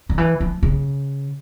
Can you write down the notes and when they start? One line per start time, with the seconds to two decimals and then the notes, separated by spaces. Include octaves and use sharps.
0.09 D#3
0.18 E3
0.40 F3
0.63 C#3